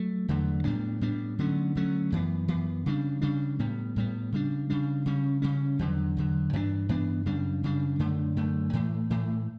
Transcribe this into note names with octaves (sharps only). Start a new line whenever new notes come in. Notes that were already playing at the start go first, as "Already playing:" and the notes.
Already playing: F#3 A3
E2 D3 F#3 A3
A2 G3 B3 D4
A2 G3 B3 D4
D3 F#3 A3 C#4
D3 F#3 A3 C#4
F#2 E3 B3
F#2 E3 B3
C#3 G3 D4
C#3 G3 D4
A2 G3 B3
A2 G3 B3
C#3 G3 D4
C#3 G3 D4
C#3 G3 C#4
C#3 G3 C#4
E2 D3 F#3
E2 D3 F#3
G2 E3 B3 D4
G2 E3 B3 D4
F#2 C#3 G3 D4
F#2 C#3 G3 D4
F#2 D3 A3
F#2 D3 A3
A2 E3 A3
A2 E3 A3